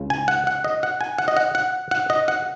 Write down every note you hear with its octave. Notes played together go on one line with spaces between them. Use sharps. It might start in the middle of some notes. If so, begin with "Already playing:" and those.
Already playing: C#2 C#3
G#5
F#5
F#5
D#5
F#5
G#5
F#5
D#5
F#5
F#5
F#5
D#5
F#5